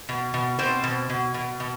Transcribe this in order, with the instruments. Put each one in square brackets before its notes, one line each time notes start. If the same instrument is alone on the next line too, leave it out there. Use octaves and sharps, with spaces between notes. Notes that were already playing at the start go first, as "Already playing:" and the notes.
[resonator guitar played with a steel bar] B2
B2
B2 C4 C5
B2
B2
B2
B2